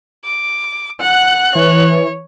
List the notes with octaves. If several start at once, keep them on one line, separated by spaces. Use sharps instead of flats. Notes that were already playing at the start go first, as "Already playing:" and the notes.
D6
F#5 F#6
E3 C#5